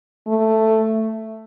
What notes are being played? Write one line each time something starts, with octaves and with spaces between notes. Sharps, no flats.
A3